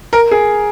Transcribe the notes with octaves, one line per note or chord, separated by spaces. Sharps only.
A#4
G#4